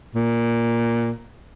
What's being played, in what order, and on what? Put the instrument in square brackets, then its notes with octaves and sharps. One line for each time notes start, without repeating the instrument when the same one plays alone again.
[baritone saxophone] A#2